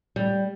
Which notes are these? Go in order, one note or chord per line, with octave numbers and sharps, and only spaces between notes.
G3